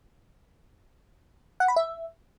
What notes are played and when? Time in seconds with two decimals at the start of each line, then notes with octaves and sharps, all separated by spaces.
1.60 F#5
1.68 B5
1.76 E5